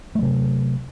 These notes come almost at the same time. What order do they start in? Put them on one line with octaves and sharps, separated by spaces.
A3 F#3 C3